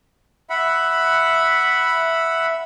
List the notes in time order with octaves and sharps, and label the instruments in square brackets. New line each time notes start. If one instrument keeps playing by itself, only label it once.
[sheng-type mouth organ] E5 F#5 B5